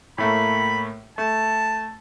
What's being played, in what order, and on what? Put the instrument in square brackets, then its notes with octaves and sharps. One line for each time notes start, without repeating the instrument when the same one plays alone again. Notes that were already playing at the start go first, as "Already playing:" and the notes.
[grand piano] A2 A3 A#3 [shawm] B5
[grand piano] A3 [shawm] A5